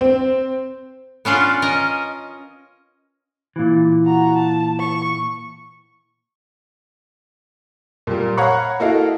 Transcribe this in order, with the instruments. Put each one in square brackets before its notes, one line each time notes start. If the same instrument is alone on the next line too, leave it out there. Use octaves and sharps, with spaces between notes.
[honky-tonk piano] C4
[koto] B3 C#4 D4 F4
C#4 A#4 D#5
[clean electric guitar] A#2 E3
[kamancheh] F#4 A#5
A5
C#6
[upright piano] A#2 G3 A#3
C#5 F5 F#5 A#5 B5 C#6
A#3 E4 F#4 A4 D#5 F5